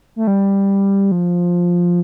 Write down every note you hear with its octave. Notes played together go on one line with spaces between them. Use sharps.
A3
G3
F3